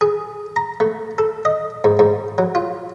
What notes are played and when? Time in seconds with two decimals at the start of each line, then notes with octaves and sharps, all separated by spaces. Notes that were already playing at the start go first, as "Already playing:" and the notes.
0.01 G#4
0.56 A#5
0.80 A3
1.18 A4
1.45 D#5
1.84 G#2
1.99 G#2
2.38 F#3
2.55 F4